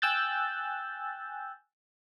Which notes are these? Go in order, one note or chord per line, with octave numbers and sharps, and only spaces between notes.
G5 G#5 E6 F#6 G6 A6